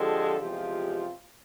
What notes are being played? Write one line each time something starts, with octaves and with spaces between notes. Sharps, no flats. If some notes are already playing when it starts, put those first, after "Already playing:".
Already playing: F2 D3 F3 G#3 G4 A4
E2 C3 F3 G#3 F4 G4